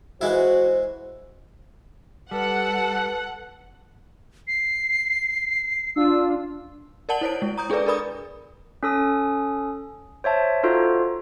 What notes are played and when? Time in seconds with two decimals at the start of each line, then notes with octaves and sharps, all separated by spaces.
0.21 E3 G#3 E4 F#4 C5
2.31 G3 A4 B4 F#5
4.48 C7
5.96 D4 F4 E6
7.09 A#4 D5 F#5 A5 F#7 G7
7.21 E4 C5 C#5 D7
7.42 G#3
7.58 A#5 D#6 G6
7.70 D4 G#4 A4 B4 D5
7.86 A#4 B4 D5 B5 D#6
8.83 C#4 A4 D#6
10.24 C5 C#5 E5 A5
10.63 D#4 F4 F#4 A4 C5